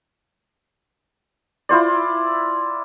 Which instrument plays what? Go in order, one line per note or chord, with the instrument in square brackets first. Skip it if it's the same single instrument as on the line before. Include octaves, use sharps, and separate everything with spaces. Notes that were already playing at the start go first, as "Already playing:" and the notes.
[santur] E4 F4 C5 D5